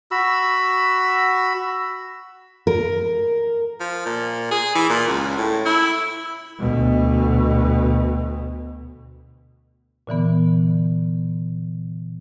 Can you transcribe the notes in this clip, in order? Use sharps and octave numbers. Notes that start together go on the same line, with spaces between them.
F#4 B5 E6
A#4
F3
A#2
G#4
E3
A#2
C#2
A2
E4
D2 B2
A#2 D3 E3 B3